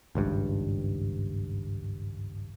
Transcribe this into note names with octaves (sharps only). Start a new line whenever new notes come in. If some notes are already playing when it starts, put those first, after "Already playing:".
G#1 C#2 G2